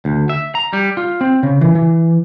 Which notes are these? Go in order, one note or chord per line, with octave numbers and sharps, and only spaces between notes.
D2
E5
A#5
G3
F4
C4
C#3
E3
E3